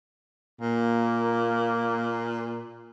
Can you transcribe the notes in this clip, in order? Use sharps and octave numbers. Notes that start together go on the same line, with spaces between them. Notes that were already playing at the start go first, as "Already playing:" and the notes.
A#2 A#3